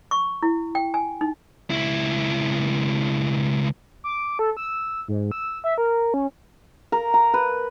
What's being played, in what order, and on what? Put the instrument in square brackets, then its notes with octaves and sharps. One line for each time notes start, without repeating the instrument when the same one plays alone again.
[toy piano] C#6
E4
G5
G#5
D#4
[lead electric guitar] C#2 E4
[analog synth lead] D6
A4
E6
G#2
E6
E5
A#4
C#4
[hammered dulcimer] A#4
A#5
B4